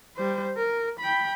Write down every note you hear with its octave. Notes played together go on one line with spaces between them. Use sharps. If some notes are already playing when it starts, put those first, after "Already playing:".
G3 C5
A#4
G5 B5